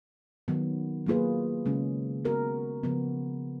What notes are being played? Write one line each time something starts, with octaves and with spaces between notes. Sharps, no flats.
D#3 F#3 B3
F#3 A#3 F4 G#4 B4
C#3 G#3 C#4
B3 F#4 A#4
C#3 F3 B3